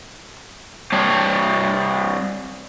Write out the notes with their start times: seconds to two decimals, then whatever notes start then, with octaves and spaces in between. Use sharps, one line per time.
0.92 G3 C4 C#5 A5